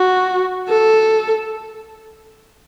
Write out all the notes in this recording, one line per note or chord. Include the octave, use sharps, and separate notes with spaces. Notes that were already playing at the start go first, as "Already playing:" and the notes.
Already playing: F#4
A4